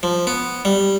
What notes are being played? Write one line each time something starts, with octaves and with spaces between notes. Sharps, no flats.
F3
B3
G3